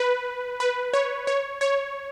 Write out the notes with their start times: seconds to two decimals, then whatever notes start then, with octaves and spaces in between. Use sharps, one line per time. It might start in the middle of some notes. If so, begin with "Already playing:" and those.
Already playing: B4
0.60 B4
0.93 C#5
1.27 C#5
1.61 C#5